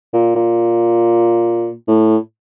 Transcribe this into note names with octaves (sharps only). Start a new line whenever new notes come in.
A#2
A#2
A2